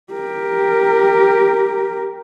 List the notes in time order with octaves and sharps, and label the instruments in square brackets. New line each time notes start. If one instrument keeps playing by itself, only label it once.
[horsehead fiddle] G4 A#4